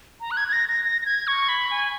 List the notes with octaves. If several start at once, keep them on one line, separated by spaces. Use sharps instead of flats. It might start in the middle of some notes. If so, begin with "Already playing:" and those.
A#5
F#6
G#6
G#6
A#6
A#6
A#6
A#6
G#6
C#6
B5
G#5